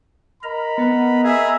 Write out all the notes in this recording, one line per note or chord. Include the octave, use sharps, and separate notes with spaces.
A#4 D#5 A#5 B5
B3
G#4 E5